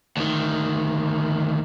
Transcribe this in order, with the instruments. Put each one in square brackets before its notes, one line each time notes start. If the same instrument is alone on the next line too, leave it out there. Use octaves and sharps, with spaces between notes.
[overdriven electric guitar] D2 D#3